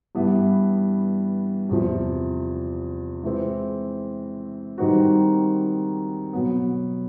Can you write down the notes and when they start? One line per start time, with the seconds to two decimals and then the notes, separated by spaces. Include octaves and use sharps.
0.15 G2 E3 G3 B3 E4
1.69 E2 C3 F3
3.24 E3 G#3 C4
4.78 D#3 G3 C4 D#4 F#4
6.33 B2 F#3 B3